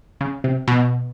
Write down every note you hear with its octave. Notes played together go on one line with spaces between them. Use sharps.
C#3
C3
B2